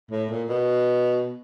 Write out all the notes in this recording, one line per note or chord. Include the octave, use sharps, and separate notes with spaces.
A2
A#2
B2